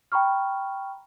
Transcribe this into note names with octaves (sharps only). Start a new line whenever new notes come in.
G5 A#5 B5 C#6 F6